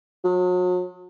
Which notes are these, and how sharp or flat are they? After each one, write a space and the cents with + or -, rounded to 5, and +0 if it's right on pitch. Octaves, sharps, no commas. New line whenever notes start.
F#3 -40